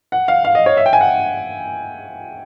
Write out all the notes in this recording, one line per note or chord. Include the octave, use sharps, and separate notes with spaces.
F#5
F5
F5
D#5
C#5
E5
G5
G#5
F#5